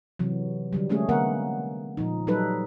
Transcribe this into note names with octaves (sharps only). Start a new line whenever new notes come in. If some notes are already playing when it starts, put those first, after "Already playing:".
C3 E3 F#3
D3 F#3 G3
G#3 A3 C#4 G#4
D3 A#3 B3 A#4 F#5
A#2 F3 D#4
F#3 G3 D#4 A4 B4